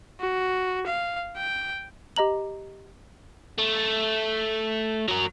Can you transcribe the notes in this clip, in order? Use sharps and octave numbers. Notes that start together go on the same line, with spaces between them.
F#4
F5
G5
G4 D#5 A#5 F#7
A3
F#3 A#4